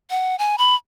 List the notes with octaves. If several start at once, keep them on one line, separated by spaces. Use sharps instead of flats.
F#5
G#5
B5